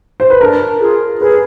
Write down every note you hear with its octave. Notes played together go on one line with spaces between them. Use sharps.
C5
B4
D4 A#4
F4 G#4
G#4 B4